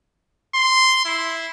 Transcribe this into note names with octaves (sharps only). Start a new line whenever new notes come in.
C6
E4